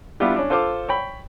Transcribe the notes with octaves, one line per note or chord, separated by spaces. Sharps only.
G3 B3 D4 E4 F4 G4
C#4 D4
F4 A4 C5 F5 D6
C#5 G5 B5